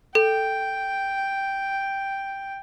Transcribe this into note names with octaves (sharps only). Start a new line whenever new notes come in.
A4 G5